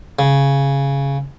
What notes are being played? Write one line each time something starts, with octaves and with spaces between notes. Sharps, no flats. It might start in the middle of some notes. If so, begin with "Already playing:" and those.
C#3